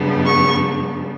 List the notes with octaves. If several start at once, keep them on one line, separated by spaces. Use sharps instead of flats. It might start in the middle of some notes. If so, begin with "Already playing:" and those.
Already playing: F#2 C#3 G3 B3 D4
C#6